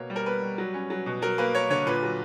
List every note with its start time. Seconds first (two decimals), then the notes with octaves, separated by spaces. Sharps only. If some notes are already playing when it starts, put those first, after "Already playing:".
Already playing: B2 A#3 C#5
0.10 G3
0.16 A#4
0.26 B3 B4
0.42 G3
0.58 F#3
0.74 C#4
0.90 F#3
1.06 B2
1.22 F#3 A#4
1.38 A#3 B4
1.54 A#3 C#5
1.70 D3 C#5
1.86 A#2 B4
2.03 F#3